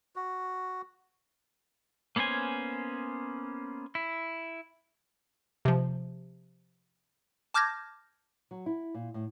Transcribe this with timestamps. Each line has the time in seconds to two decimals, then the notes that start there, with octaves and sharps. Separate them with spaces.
0.16 F#4
2.16 A#3 B3 C#4 C5 G#5
3.95 E4
5.65 C3 F3
7.54 A5 D6 F6 G6 G#6 A#6
8.51 F#3
8.66 E4
8.94 A#2
9.14 A2